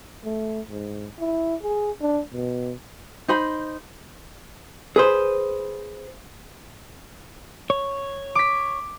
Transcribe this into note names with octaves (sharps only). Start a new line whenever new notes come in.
A3
G#2
E4
G#4
D4
B2
D#4 C5 B5
G#4 B4 C5
C#5
D6 B6